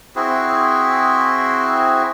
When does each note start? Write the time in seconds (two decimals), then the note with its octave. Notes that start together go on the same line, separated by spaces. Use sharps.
0.16 C4 E4 F#4 G#4